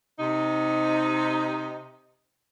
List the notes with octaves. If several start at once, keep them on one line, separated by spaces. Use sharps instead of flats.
C3 D#4